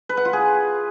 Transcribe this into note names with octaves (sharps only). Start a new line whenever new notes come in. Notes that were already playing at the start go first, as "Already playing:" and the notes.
B4
F#5
F4
G#4